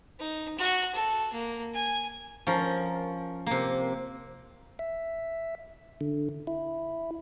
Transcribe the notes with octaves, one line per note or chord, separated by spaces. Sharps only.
D#4
F#4
A4
A#3
G#5
F3 C#4 A#4
C3 A#3
E5
D3
E4